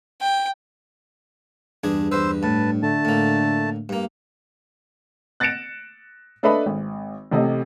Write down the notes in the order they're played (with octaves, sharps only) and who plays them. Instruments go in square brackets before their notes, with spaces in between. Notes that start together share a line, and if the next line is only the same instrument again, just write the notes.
[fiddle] G5
[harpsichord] E2 D4 G#4 [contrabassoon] G2
[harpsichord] E2 B4 [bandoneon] C5 E6
[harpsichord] A2 [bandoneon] B4 A5
[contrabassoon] D3 [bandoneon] A3 A5
[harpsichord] A2 A#3
G2 A#3
[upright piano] F#6 A6 A#6 C#7 D7 E7
D4 A4 B4 D#5 E5 B5
G#1
A1 C3 A4 D#5